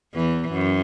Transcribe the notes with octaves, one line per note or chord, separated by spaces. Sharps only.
E2 E3
F#2